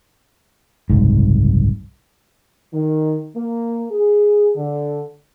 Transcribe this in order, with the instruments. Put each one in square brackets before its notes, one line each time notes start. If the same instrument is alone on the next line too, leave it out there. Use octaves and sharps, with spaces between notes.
[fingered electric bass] F#1 C2 G#2
[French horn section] D#3
A#3
G#4
D3